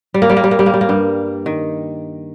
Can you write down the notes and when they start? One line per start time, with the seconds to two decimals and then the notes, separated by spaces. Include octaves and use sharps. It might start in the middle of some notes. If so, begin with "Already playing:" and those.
0.14 G3
0.22 A#3
0.29 G3
0.37 A#3
0.44 G3
0.51 A#3
0.59 G3
0.66 A#3
0.74 G3
0.81 A#3
0.89 G2 G3
1.46 D#3